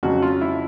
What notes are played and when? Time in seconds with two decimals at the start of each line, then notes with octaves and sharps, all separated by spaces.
0.03 F2 C#3 F#3 F#4
0.22 F4
0.41 E4